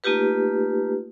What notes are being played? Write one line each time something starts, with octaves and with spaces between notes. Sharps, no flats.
A3 A#3 D#4 F4 G4 B4